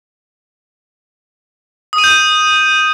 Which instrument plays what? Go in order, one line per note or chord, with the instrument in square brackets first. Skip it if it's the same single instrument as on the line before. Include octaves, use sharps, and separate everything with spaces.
[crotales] D#6
D#7
G6